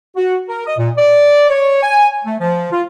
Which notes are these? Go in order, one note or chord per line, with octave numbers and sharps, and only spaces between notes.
F#4
A#4
D#5
A#2
D5
C#5
G#5
A3
F3
F4